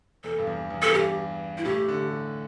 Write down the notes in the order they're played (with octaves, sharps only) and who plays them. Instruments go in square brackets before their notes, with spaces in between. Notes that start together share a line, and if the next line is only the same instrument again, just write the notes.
[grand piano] E2 [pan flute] A4
[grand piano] G2
E2
E2
[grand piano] E2 [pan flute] A4
[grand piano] G2 [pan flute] G4
[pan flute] E4
[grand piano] A2 [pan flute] G4
[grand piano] D3